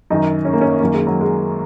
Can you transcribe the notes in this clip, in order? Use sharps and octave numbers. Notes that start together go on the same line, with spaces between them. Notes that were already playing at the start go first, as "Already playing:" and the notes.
F#2 D#3 D#4
C#4
A#3
C#4
F#2 D#3 A#3
G#3
F#3
G#3